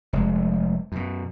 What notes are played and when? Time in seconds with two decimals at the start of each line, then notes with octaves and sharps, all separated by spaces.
0.13 F1 G#3
0.92 F#2 B2